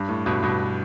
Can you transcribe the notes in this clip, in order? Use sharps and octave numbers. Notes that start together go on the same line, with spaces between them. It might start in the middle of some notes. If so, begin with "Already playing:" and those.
Already playing: G2
A2
G2 B2
G2 B2